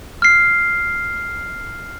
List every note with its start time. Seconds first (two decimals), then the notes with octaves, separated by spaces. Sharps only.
0.22 F6 C7